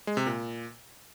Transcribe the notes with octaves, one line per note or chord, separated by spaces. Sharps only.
G#3
C3
A#2